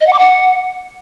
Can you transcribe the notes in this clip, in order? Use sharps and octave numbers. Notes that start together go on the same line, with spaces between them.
D#5
F#5
D6
F#5